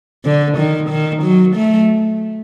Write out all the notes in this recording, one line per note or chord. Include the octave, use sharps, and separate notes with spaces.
D3
D#3
D#3
F#3
A3